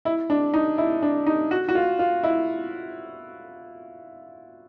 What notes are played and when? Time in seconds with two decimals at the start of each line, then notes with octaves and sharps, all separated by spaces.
0.05 E4
0.30 D4
0.54 D#4
0.78 E4
1.02 D4
1.26 D#4
1.51 F#4
1.68 F#4
1.75 F4
1.99 F4
2.23 E4